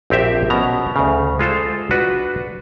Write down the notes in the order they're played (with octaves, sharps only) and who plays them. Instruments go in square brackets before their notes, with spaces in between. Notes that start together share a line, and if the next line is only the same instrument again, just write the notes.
[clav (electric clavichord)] A#1 C4 G4 E5 G5
B2 B3 C#4 A#5
D2 C#3
G#3 F4 A4 C5
D4 F#4 B4